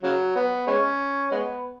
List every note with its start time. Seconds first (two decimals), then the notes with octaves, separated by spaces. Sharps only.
0.03 C#3 F#3
0.36 B3
0.67 G#3 C#4
1.31 G#3 B3